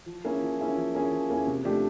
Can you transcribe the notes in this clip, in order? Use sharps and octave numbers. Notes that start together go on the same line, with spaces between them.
F3
A#3 C#4 E4 G#4
F3
A#3 C#4 E4 G#4
F3
A#3 C#4 E4 G#4
F3
A#3 C#4 E4 G#4
C3
F3 A3 D4 G4